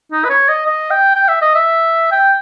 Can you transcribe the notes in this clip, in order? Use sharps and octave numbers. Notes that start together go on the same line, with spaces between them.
D#4
B4
C#5
D#5
D#5
G5
G5
E5
D#5
E5
G5